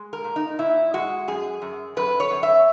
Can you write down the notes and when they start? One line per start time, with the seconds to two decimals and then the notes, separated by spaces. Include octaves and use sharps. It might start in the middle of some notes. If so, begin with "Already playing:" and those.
Already playing: G#3
0.13 A#4
0.24 A#2
0.36 D#4
0.59 A#2 E4
0.94 G#3 F#4
1.28 F#2 G#4
1.62 F#2
1.97 F#2 B4
2.20 C#5
2.31 F#2
2.43 E5